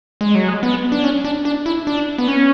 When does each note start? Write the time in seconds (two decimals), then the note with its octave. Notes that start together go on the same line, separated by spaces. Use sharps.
0.21 G#3
0.35 F#3
0.48 G#3
0.63 B3
0.92 D4
1.04 C#4
1.25 D4
1.45 D4
1.66 E4
1.87 D4
2.18 B3
2.28 C#4